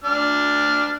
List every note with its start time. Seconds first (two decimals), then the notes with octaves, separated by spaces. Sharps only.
0.04 D4 F6